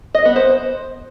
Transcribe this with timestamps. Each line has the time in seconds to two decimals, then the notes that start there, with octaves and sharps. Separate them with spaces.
0.15 D#5
0.25 B3
0.36 C5